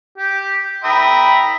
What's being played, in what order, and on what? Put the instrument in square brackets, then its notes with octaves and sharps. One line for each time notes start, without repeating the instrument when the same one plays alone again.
[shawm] G4
[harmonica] E5 G5 D#6 [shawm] A#5 [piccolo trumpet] B5